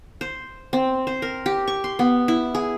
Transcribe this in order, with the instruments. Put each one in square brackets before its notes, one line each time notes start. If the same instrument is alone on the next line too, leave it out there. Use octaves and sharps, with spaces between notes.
[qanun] C5
C4
C5
A#4
G4
C#6
C6
B3
E4
G#4